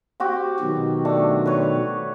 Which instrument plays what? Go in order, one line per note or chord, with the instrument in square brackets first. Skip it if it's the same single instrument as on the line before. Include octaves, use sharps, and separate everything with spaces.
[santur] C4 F#4 G4
[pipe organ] B2 D#3 F#3
[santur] A3 D4
B4 C#5